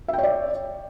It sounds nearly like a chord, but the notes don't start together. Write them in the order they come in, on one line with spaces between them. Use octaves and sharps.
E5 G5 C#5 D5